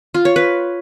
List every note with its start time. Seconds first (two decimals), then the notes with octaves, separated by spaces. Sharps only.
0.14 F4
0.25 C#5
0.36 B4